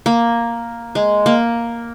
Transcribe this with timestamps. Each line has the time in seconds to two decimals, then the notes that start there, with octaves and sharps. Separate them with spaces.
0.06 A#3
0.95 G#3
1.26 A#3